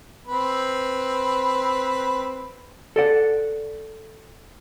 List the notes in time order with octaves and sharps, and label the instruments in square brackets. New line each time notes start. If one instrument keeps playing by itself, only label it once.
[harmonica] C4 B4
[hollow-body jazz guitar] A4 D5 F#5